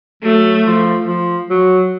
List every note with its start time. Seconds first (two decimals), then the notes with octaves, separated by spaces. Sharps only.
0.23 F#3 A3
0.65 F3
1.07 F3
1.50 F#3